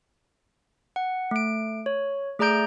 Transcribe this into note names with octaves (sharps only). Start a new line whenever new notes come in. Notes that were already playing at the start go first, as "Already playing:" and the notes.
F#5
A3 D7
C#5
A3 G#4 D5 A#5 G6 D7